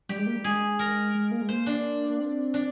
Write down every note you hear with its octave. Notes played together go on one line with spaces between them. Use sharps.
G3 G4
G#3
A#3
G3
G#3 G#4
A#4
G#3
A#3
G#3
A#3 C5
D4
A#3
C4
D4